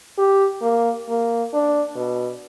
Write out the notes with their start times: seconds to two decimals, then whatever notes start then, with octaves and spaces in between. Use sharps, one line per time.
0.18 G4
0.62 A#3
1.09 A#3
1.54 D4
1.96 B2